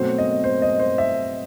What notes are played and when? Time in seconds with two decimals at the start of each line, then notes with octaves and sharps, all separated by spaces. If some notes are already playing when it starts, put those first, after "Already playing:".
Already playing: B2 F#3 A3 C4 C5
0.18 D#5
0.44 C5
0.62 D#5
0.80 C5
0.98 E5